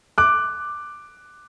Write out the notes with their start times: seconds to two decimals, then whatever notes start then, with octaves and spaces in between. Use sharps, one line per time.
0.18 D6 F#6